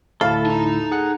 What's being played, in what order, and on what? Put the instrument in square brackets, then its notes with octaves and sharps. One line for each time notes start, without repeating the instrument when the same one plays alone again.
[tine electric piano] D2 A2 E4 [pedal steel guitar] A4 A5 [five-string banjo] F5
[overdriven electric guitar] D#4 A#5
[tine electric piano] G#4 F#5 F#6